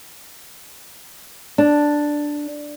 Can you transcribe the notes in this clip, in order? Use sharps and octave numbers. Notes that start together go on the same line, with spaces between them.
D4